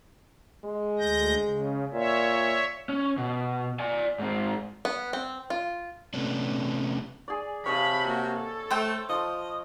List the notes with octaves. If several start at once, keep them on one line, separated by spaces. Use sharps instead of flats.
G#3
D2 G6 A#6
C#3
A#2 C#5 E5
C#4
B2
D5 G#5
G#2 C4
B3
C4
F4
C3 A3 B3 C#4 D4
G#4 D5
C3 C#5 D#5 F5 A5 B5
A#3 F#4
A4
A3 C5 G5
F3 D#5